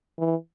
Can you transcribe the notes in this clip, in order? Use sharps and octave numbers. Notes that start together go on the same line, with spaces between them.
E3